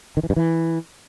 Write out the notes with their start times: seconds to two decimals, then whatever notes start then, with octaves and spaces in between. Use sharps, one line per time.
0.17 D#3
0.23 E3
0.30 G2
0.36 E3